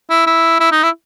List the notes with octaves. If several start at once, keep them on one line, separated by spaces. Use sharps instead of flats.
E4
E4
E4
D#4
E4